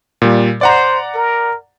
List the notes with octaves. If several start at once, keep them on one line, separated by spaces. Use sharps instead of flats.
A#2 G3
C5 D5 F#5 A#5
A#4